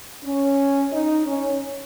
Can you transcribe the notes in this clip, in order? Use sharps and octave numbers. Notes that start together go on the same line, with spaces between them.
C#4
D#4
C#4